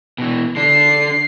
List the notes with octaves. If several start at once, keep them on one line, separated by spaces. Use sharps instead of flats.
B2 E3
D3 D4 C7